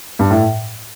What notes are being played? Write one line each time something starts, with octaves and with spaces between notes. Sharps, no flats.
G2
A2